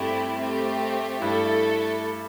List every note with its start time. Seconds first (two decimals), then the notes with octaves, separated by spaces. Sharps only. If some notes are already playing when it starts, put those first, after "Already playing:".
Already playing: G2 A3 C4 E4 G4
0.38 A3 C4 G4
1.21 G2 A3 E4 A4